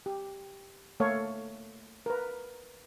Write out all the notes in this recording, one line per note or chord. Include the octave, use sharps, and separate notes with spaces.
G4
A3 A#3 A4 C#5 F5
A#4 B4